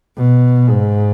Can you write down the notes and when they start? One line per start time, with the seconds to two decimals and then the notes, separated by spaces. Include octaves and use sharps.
0.17 B2
0.70 G#2